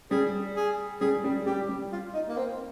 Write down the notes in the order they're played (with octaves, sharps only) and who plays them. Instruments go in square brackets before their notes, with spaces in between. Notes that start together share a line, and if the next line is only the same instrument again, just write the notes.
[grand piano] G3 [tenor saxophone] G#4
[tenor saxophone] G#4
[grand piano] G3 [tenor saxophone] G#4
[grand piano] G3
[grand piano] G3 [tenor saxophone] G4
[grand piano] G3
[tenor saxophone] F4
D#4
A#3
C4